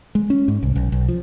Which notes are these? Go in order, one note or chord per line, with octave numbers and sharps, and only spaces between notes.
G#3
C#4
G#2
C2
B1
B1
F3